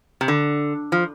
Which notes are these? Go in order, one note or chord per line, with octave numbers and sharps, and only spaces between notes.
C3
D3
F3